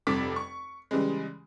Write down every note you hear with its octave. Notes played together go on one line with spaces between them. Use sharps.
F1 G2 C3 A4 D6 B6
C#6
C#3 E3 G3 G#3